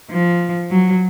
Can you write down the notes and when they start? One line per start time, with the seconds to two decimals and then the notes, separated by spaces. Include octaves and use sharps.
0.11 F3
0.71 F#3